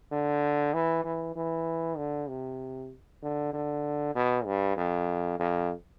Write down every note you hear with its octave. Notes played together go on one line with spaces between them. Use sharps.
D3
E3
E3
E3
D3
C3
D3
D3
B2
G2
F2
F2